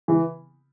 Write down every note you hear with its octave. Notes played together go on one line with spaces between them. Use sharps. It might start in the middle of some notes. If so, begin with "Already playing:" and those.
E3